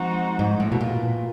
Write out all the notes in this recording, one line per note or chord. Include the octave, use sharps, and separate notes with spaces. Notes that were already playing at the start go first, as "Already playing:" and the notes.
Already playing: F3 G#3 C4 D#4 F#4
G#2
A2
B2
A#2